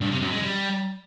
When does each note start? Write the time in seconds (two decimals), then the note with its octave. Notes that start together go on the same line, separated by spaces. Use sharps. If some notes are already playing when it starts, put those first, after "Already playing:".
0.01 G2
0.11 C3
0.21 F#2
0.32 G#3
0.42 G3